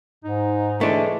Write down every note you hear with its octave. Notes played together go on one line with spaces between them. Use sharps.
G#2 D#4
E3 G#3 A3 D4